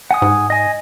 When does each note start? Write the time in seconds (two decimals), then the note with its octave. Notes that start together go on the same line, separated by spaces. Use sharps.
0.11 F#5 G#5 D#6
0.22 G#2
0.50 D#5 G#5